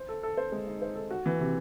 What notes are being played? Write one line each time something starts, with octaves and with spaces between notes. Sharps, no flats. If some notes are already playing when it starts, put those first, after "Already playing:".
Already playing: C5
A4
A4
C5
G#3
D#4
C5
A4
F#4
E3
C3